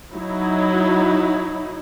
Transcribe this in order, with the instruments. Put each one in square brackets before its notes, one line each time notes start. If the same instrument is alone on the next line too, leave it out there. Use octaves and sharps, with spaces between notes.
[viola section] F#3 D#4 E4